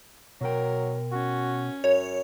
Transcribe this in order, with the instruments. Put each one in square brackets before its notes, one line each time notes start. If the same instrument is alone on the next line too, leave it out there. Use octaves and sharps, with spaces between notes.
[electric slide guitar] B2 G5 [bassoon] F#3 [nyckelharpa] A#4
[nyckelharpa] C#4 [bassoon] F#4
[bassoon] F#2 [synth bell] C#5